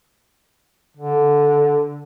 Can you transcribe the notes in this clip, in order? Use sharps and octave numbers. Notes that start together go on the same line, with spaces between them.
D3